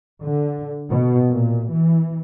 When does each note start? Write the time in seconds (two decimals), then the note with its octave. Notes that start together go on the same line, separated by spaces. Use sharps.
0.23 D3
0.90 B2
1.30 A#2
1.72 E3